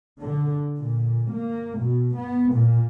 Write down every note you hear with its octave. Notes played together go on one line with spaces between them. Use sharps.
D3
A#2
A#3
B2
B3
A#2